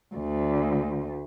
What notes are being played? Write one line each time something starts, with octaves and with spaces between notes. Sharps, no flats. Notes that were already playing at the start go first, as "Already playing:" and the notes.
D2